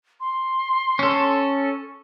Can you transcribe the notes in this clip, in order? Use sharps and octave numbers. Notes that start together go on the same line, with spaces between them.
C6
C#4 A4